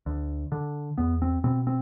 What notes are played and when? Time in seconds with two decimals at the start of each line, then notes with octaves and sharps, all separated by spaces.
0.06 D2
0.52 D3
0.98 E2 B3
1.22 C4
1.44 B2 C4
1.67 C4